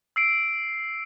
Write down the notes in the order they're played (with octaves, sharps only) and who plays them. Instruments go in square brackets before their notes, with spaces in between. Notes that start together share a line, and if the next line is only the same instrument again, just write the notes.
[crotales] E6 C7 D7